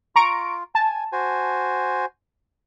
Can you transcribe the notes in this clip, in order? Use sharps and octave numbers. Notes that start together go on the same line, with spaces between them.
F4 A#5 C#6 D7
G#5 A5
F#4 C5 G#5